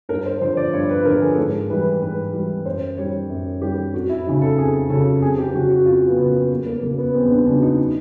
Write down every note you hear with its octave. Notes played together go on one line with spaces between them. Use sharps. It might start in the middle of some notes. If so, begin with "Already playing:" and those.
G2 A#4
C5
D3 F3 C5
D5
G2 C#5
B4
D3 F3 A#4
G#4
A4
G#2 A#4
E3 G3 B4
G#2 B4
E3 G3
F#2 C5
D#3 G3 C#5
F#2
D#3 G3 G4
F2 F#4
E4
C#3 F#3 D#4
A4
F2 G#4
C#3 F#3 A4
F2 G#4
G4
C#3 F#3 F#4
F#4
F2 F4
B3
C#3 F#3
A#3
E2 B3
A#3
C#3 F#3 A#3
B3
E2 C4
D4
C#3 F#3 D4
D#4
D#4